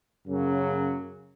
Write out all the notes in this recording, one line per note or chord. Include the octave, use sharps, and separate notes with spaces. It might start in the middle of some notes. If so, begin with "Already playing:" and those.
F#2 C#3 F#3 A#3